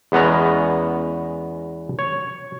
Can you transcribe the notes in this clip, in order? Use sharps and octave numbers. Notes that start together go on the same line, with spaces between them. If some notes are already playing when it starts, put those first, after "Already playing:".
E2 G#3 B3 C#4 A#5
C#5